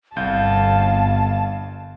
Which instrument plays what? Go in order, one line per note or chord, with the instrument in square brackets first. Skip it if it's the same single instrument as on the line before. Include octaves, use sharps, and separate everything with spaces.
[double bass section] G1 [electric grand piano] C2 G6 [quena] F5 [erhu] A5